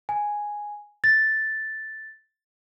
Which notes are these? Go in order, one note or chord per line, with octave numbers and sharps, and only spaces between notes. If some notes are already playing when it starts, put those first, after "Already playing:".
G#5
A6